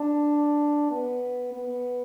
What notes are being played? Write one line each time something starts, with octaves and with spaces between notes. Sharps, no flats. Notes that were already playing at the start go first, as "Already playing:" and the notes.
Already playing: D4
B3
B3